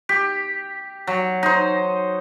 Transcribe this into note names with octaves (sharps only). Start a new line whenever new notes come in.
G4
F#3
D#4 C5